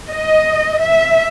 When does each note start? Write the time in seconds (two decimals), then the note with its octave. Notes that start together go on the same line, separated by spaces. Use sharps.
0.10 D#5
0.82 E5